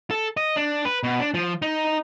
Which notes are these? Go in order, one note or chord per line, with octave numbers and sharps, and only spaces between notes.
A4
D#5
D4
B4
B2
D4
F3
D#4